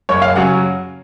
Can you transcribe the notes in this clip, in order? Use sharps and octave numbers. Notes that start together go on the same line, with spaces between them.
F#1 C#5
F5
C#3 F#3 C#4 F#5